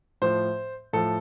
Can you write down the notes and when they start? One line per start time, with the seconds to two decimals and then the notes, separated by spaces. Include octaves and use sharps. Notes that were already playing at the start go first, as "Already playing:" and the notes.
0.22 A2 F3 C5
0.93 A2 F3 A4